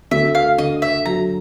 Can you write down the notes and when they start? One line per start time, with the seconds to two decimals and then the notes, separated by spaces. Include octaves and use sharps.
0.11 D2 E5
0.35 F5
0.58 D3 D#5
0.82 E5
1.06 F#3 A#5